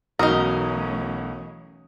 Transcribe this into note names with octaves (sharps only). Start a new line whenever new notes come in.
B1 E3 A3 C#4 D#4 F#4 A#4 D#6